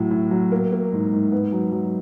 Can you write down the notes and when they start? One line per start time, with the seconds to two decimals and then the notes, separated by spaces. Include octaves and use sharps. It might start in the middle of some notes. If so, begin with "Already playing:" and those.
Already playing: A2 F#3
0.11 A2
0.31 F#3
0.52 A#3
0.72 A#3
0.93 G#2
1.12 G#2
1.32 B3
1.53 F#3
1.72 F#3